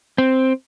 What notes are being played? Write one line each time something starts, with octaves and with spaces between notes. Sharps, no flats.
C4